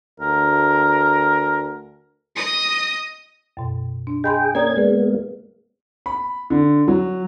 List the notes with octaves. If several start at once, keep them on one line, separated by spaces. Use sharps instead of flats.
D2 A#4
D#5 D#6
F#2 B2
D4
G#4 D#5 G5 B5 C6
A#3 C#4 D5 A#5 D#6 G#6
G#3 A#3 B3 G#4 D5
B5
D3
F#3